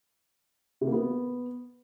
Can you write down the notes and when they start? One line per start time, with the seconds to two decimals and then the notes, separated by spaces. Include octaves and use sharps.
0.81 C3
0.87 A#3
0.92 B3